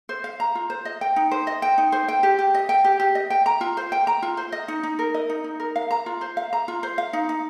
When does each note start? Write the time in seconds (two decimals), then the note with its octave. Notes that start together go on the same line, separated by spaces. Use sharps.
0.09 C5
0.24 F5
0.40 A#5
0.55 F4
0.70 C5
0.85 D#5
1.01 G5
1.16 D#4
1.31 C5
1.47 D#5
1.62 G5
1.78 D#4
1.92 C5
2.08 G5
2.23 G4
2.39 G4
2.54 D#5
2.69 G5
2.85 G4
3.00 G4
3.15 D#5
3.30 G5
3.46 A#5
3.61 F4
3.77 C5
3.92 G5
4.07 A#5
4.23 F4
4.37 C5
4.52 D#5
4.68 D#4
4.83 D#4
4.99 A#4
5.14 D#5
5.29 D#4
5.44 D#4
5.60 A#4
5.76 F5
5.91 A#5
6.06 F4
6.21 C5
6.37 F5
6.53 A#5
6.68 F4
6.83 C5
6.98 F5
7.13 D#4
7.29 D#4